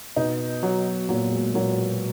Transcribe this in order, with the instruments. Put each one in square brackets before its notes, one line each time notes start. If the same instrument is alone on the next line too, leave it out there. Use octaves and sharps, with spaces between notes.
[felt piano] B2 B3 [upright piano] D#4
[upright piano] F#3
[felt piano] A#2 A#3 [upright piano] F#3
[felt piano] G#3
[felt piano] A#2 A#3 [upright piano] F#3